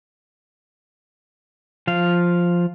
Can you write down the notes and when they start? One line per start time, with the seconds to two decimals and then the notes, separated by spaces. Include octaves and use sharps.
1.87 F3 F5